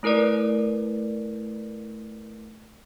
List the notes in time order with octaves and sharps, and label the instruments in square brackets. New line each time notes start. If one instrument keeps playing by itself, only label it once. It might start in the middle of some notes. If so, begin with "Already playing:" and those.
[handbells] A3 E4 A#4 B4 D5